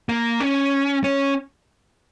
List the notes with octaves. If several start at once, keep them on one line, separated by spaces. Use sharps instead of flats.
A#3
C#4
C#4